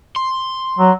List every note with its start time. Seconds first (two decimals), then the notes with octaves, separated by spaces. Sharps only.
0.16 C6
0.79 F#3